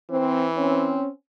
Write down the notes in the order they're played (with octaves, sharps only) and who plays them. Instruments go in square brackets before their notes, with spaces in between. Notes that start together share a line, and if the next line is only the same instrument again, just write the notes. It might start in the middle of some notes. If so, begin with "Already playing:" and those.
[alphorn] E3 [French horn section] C4
[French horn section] C4 C#4